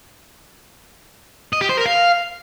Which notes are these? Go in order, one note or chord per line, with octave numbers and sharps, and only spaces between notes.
D#5
G4
C5
A#4
F5